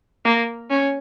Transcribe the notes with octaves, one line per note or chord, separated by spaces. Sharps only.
A#3
C#4